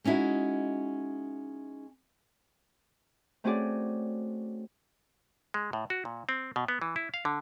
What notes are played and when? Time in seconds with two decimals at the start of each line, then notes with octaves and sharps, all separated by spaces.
0.04 G#3 C#4 D#4 E4 F#4
3.44 A3 C4 C#4 F#4 G#4 D5
5.54 G#3
5.73 A2
5.90 F#4
6.05 A#2
6.29 C4
6.56 B2
6.68 B3
6.82 E3
6.96 E4
7.14 F5
7.25 D3